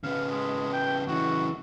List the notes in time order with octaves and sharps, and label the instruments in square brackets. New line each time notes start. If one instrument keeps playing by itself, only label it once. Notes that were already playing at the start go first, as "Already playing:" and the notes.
[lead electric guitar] C#3 B3 [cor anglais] F5
[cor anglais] G#3
G5
[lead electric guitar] C#3 E3 [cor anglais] F#4